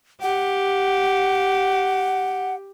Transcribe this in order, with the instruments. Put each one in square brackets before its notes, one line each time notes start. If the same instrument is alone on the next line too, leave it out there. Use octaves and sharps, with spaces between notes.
[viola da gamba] G4 [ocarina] F#5